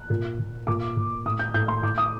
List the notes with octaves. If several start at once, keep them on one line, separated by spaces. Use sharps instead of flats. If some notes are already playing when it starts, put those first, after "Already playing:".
Already playing: F#6
A#2
A#2
A#2 D6
A#2
A2 D#6
G6
A2 G6
C6
A2 D6
D#6